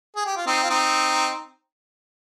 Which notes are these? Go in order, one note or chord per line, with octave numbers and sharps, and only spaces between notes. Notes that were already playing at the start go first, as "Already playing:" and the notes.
G#4
G4
F4
C4 D#4
F4
C4 D#4